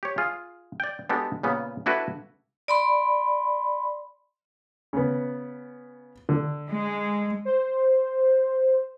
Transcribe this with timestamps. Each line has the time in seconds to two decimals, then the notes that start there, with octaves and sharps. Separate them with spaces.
0.03 G4 C#5
0.18 F4 G#4
0.80 D5 G5
1.09 G#3 B3 D4 F#4 G4 A4
1.43 A#2 C#3 B3
1.86 D4 E4 F#4 A4 B4
2.68 D5 B5 C6
4.93 C#3 B3
6.29 D3
6.68 G#3
7.45 C5